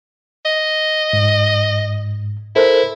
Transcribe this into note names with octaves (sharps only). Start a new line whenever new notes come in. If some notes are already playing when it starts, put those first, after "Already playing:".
D#5
G#2
E4 A4 A#4 C5